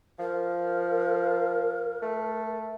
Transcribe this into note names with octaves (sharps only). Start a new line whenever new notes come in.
F3 A#4
A3